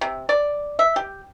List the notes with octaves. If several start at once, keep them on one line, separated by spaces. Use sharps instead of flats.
C3
D5
E5
G4